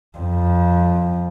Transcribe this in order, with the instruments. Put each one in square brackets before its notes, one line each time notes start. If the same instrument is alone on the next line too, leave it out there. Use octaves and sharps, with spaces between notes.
[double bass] F2